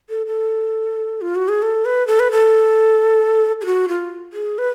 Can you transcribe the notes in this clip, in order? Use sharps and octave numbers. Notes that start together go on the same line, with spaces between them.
A4
A4
F4
F#4
G#4
A4
B4
A4
B4
A4
G#4
F#4
F4
G#4
B4